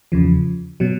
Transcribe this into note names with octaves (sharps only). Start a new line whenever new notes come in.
E2 C#3 F3
B2 F#3